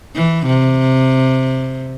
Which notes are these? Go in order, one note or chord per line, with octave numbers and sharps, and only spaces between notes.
E3
C3